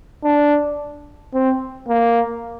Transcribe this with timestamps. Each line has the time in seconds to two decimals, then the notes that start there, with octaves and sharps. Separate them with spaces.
0.24 D4
1.34 C4
1.88 A#3